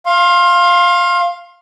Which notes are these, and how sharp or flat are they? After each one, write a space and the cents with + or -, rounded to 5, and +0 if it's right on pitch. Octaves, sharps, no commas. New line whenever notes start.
F5 +0 C6 +30